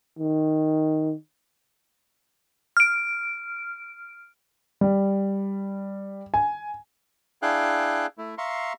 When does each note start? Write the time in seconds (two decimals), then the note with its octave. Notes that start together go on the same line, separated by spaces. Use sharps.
0.19 D#3
2.77 F6 D7
4.81 G3
6.34 G#5
7.42 D4 E4 G#4 F5 G5 F#6
8.18 A3 E4
8.38 E5 F5 A#5 C6 C#6